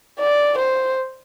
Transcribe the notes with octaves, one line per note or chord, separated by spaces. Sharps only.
D5
C5